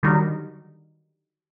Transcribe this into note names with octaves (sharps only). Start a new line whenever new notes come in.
D3 D#3 F#3 G3 D#4 A#4